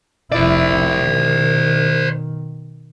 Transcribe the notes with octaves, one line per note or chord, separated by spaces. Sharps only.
F1 E4 C5 D5
B2 D#3